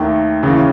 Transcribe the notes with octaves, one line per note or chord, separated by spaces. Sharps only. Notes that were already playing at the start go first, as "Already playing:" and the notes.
Already playing: D#2 D#3 A3
D#2 C#3 E3